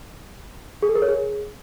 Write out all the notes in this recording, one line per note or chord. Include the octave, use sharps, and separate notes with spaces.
G#4
A4
A#4
C#5
G#4